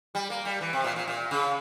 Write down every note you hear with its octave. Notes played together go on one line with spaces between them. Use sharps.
G3
A#3
G3
E3
C3
A#2
A#2
A#2
C#3